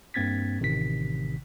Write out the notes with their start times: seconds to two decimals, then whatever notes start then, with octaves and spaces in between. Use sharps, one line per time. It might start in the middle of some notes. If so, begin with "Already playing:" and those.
0.14 G2 A#3 C4 G#6 A6 B6
0.60 A1 C3 D#3 B6